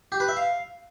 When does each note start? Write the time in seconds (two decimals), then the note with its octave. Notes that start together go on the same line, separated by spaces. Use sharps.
0.12 G4
0.20 B4
0.28 E5
0.37 F5